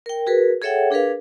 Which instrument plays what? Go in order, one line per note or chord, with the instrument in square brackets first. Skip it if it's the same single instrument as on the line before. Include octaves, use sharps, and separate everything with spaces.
[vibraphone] A#4 G5
F#4 G#4 A#4 B4
G#4 A4 C#5 E5 F#5 G5
D4 G#4 A#4 B4 F5